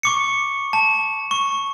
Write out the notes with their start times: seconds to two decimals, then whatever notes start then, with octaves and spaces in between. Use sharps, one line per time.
0.03 C#6 D6 C#7
0.73 A5
1.31 C#6